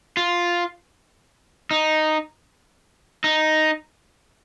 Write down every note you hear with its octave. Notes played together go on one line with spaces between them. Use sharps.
F4
D#4
D#4